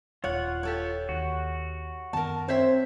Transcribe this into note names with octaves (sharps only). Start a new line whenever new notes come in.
D#1 F4 C#5 F#5
G4 A4 C#5
D#2 F#4
F#2 D#3 B3 A#4 A5
C4 C5 C#5 E5